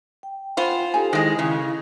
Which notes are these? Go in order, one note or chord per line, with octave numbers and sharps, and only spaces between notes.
G5
F4 C5 F#5 G#5 B5
D#4 G4 A4 G#5
D#3 G#3 E4
C#3